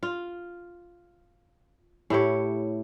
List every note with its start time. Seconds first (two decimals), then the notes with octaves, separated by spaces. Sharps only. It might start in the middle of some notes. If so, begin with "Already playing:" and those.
0.03 F4
2.10 A2 E4 G4 C#5